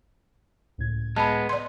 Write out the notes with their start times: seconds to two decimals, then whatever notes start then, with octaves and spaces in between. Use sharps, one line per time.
0.78 C#2 A2 G#6
1.16 G#3 B3 A5 B5
1.49 D5 C6